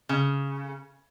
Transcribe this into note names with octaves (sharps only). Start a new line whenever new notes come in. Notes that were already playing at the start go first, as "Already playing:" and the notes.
C#3